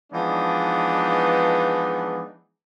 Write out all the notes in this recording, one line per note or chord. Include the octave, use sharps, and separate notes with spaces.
E3 F3 G#3 B3 D4 D#4